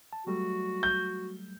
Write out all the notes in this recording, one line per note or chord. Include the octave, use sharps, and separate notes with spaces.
A5
F#3 G3 A3 F#4
G6